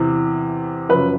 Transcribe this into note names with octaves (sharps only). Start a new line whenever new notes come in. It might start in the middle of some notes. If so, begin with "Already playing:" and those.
Already playing: E2 C3 E3
F#2 C#3 F3 B4